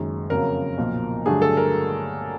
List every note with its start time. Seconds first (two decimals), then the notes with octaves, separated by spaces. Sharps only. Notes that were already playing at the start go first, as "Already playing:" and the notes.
Already playing: F#1 F#2 D#3 G#3
0.30 F2 C#3 F#3 A#3 C#4 A#4
0.77 B1 A#2 F3
1.25 G2 D3 F#3 A3 D4 G#4
1.42 A4
1.57 A#4